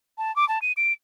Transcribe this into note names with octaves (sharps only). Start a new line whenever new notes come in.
A5
D6
A5
D#7
D7